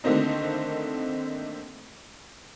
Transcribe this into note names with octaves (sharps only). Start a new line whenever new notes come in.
D3 D#3 A3 A#3 C4 D#4